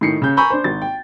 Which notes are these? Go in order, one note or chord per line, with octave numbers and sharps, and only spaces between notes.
A2 D#3 C7 C#7
C#3 G6
G#5 A#5 B5 C#6 E6 G6
D4 C5
G#1 A6
G5